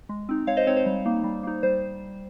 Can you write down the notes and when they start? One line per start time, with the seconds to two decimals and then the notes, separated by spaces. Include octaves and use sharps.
0.09 G#3
0.29 C4 D#4
0.47 G#3 C#5 F5
0.57 C5 D#5
0.67 C4 D#4 C#5
0.77 C5
0.86 G3
1.06 A#3 D#4
1.24 G3
1.43 A#3 D#4
1.63 G3 C5